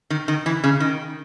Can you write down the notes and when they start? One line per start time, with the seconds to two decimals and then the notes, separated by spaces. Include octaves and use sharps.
0.10 D#3
0.28 D#3
0.46 E3
0.64 C#3
0.80 D#3